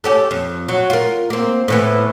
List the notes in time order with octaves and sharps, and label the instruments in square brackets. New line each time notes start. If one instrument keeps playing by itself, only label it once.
[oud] A3 C#4 G4
F2
F#3 F#4
F4 A#4
A#3 C4
A2 E3 B3